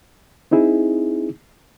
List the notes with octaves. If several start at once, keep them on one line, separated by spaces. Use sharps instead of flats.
C4 D#4 E4 G#4